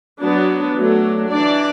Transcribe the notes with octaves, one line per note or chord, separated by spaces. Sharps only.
F#3 B3 D4
F#3 A3 D4
E3 D4 D5